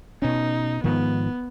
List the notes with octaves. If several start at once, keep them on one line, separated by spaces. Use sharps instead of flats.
B2 C#4 D#4
G#2 D#3 F3 B3